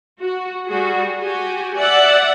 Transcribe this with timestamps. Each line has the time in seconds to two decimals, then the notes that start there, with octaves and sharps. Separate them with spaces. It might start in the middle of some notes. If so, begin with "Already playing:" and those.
0.20 F#4
0.67 G3 F#4 G#4
1.18 F#4 G4 G#5
1.76 D5 E5 F#5